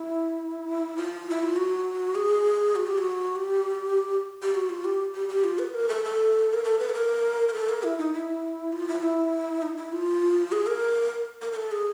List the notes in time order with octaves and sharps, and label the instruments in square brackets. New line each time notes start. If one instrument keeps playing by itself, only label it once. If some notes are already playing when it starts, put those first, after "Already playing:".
Already playing: [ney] E4
F4
E4
F4
F#4
G#4
F#4
G4
F#4
G4
G4
F#4
F4
G4
G4
G4
F4
B4
A#4
A4
A4
A#4
A4
B4
A4
A#4
A#4
A4
A#4
E4
D#4
E4
F4
E4
F4
E4
D#4
E4
F4
G#4
A#4
A#4
A#4
A4
G#4